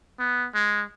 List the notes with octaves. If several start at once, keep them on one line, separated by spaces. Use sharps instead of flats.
B3
G#3